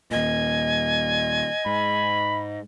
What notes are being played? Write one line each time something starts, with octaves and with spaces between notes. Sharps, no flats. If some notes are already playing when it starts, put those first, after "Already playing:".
D#2 A#2 D#5 G#5
G#2 B5